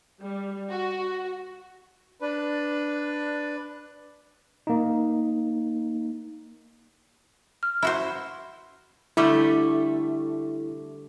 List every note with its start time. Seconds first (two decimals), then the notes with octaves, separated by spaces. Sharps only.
0.21 G3
0.70 F#4
2.21 D4 B4
4.67 A#3 D#4
7.63 F6
7.82 E4 F#4 C5
9.17 D3 G3 A3 E4